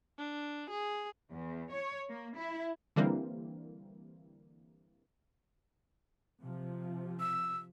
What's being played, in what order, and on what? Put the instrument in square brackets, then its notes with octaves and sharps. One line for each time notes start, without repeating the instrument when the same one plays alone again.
[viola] D4
G#4
[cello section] E2
C#5
A#3
E4
[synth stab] D3 E3 G3 A#3 C4
[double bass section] C3 F3
[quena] E6